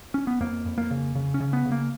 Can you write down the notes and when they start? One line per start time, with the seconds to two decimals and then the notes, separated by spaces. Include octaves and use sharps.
0.14 C#4
0.27 B3
0.41 F2 A#3
0.66 F2
0.78 A#3
0.91 C#3
1.15 C#3
1.34 C#4
1.40 C#3
1.53 B3
1.65 C#3
1.72 A#3